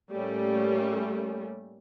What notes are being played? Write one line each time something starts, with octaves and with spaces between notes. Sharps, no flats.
A2 G3 A3 A#3 C#4